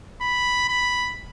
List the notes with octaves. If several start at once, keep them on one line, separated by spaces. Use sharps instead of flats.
B5
B5